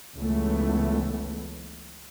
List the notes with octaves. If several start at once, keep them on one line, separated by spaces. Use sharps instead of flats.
F#1 C#2 C#3 E3 A3 B3